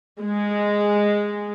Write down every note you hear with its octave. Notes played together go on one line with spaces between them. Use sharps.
G#3